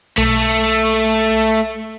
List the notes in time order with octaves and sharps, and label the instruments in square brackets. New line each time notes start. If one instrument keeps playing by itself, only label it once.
[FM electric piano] B1 [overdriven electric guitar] A3